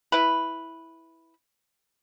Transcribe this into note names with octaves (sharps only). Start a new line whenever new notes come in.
E4 B4